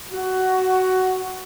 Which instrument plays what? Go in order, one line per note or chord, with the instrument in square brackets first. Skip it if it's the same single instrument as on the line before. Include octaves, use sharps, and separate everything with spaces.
[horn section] F#4